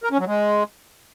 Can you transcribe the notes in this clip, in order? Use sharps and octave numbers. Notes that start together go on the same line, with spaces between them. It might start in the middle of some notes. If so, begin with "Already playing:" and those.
A#4
C#4
F#3
G#3